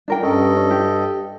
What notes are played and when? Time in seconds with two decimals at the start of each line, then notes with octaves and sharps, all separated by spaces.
0.08 D4 A#4 G5
0.23 G2 C#4 A4 D#5
0.57 C#4
0.71 G4